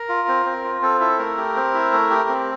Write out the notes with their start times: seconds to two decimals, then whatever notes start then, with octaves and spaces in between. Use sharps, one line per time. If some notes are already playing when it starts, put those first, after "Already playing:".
Already playing: A#4
0.09 F4
0.28 C4
0.46 C4
0.64 F4
0.82 C4 A4
1.00 E4 A4
1.18 A3 A#4
1.37 G4
1.56 C4
1.74 E4
1.93 A3
2.10 G4
2.29 C4